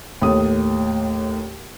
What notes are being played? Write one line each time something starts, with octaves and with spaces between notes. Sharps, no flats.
D#2 A2 D#6